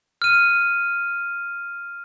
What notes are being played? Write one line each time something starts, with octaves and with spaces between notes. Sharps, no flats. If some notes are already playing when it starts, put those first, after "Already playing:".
F6 D#7